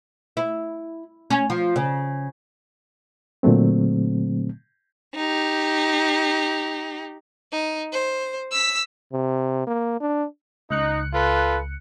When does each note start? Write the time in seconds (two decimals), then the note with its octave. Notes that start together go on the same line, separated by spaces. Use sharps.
0.37 E4
1.30 C#4
1.50 F3
1.76 C#3
3.43 A#2 D3 F#3 A3 C4
5.15 D#4 G4
7.52 D#4
7.93 C5
8.51 E6 B6
9.13 C3
9.67 A#3
10.01 D4
10.71 C#2 D#4 F#6 C#7
11.14 F4 A4 B4